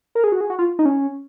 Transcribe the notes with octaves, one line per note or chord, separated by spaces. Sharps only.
A#4
G#4
F#4
G#4
F#4
F4
D#4
C#4